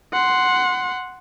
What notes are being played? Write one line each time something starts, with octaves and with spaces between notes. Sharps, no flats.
F#5 C6